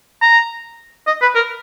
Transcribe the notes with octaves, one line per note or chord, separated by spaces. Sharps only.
A#5
D#5
B4
A#4